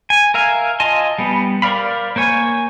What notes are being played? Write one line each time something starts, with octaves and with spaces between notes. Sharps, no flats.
G#5
A#4 E5 F5 G#5
F4 D#5 G#5 A5 C6
G3 B3
A#4 C5 D5 F5 B5
A#3 C5 C#5 G#5